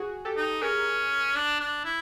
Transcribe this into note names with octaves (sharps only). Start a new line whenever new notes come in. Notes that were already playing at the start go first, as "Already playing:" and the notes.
Already playing: F#4 G#4
G4 A4
D#4
C#4 G#4 A#4
D4
D4
E4